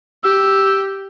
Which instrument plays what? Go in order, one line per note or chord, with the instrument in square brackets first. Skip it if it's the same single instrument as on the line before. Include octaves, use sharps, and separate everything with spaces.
[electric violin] G4 [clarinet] E6